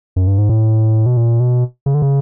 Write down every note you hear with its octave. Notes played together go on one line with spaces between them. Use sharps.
F#2
G2
G#2
A2
B2
A#2
B2
C#3
D3
C#3